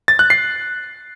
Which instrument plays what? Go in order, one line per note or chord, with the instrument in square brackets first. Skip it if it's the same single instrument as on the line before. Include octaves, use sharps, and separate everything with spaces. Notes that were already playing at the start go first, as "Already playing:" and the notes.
[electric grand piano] A6
F#6
C7